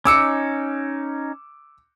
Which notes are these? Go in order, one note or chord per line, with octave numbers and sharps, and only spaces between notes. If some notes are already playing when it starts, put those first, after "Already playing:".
C#4 D#4 D6 E6 C#7